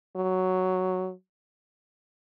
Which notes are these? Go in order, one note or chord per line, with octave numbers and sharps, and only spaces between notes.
F#3